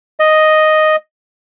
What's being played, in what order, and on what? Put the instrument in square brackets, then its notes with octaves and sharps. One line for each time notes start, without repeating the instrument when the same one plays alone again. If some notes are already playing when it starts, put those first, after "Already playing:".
[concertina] D#5